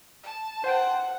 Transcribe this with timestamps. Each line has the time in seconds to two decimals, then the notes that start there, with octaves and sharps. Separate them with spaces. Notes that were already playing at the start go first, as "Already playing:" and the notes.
0.23 A5
0.64 C5 F#5 G5